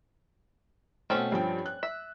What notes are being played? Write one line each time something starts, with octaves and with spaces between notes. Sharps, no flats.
B2 A3 C4 C#4 A4
G2 F3 G5
F#6
E5